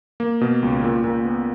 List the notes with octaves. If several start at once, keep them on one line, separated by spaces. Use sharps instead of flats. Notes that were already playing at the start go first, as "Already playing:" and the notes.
A#3
B2
C#2
A#2
A#2
B3